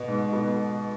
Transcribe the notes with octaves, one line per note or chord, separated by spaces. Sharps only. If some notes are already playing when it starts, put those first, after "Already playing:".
Already playing: B2
G#2
B2